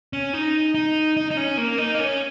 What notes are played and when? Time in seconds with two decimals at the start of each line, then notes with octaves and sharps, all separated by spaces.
0.13 C#4
0.33 D#4
0.75 D#4
1.17 D#4
1.31 D#4
1.37 C#4
1.57 A#3
1.78 D#4
1.95 A#3
1.99 C#4